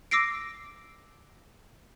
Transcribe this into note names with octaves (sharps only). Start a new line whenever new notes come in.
D6 E6 A#6 C7 D7